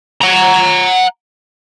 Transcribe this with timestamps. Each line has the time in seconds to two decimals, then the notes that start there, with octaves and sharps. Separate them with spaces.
0.22 F#5 A#5